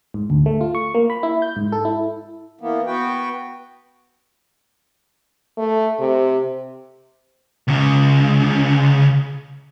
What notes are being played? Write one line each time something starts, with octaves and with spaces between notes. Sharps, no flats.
G#2
D2
A3
F4
C#6
A#3
B5
E4
G6
G#2
A4
E4
E3 A#3 B3
B3 F#4 B4 G5
A3
C3
C#2 C#3